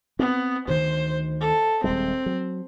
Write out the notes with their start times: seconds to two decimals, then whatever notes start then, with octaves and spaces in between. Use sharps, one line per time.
0.19 B3 C4
0.68 D2 D#3 C5
1.41 A4
1.84 D#1 G3 G#3 C4
2.26 F#3